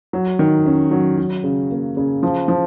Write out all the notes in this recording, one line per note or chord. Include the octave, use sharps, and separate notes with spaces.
F#3
D#3
C#4
F#3
F#3
C#3
A#3
C#3
F3
F3